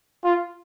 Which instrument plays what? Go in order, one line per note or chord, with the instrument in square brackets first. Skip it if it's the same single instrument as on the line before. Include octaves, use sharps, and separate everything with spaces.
[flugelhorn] F4